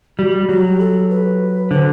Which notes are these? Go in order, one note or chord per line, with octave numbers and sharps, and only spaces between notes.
G3 F#4
F#3 G4
A4
B4
D3 C5